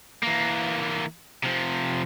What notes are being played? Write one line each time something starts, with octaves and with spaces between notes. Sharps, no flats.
E3 A#3
C3 F3